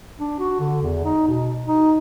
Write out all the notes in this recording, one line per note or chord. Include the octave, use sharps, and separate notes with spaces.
D4
F#4
D3
E2
D#4
B2
D#4